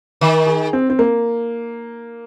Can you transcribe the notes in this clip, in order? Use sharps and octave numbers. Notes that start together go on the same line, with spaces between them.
D#3
G#4
C4
C4
A#3